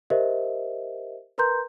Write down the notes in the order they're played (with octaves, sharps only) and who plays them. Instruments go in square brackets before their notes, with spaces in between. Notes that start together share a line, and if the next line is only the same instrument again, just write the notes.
[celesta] G4 A#4 C5 D#5 E5
A#4 B4 A#5 C6 G6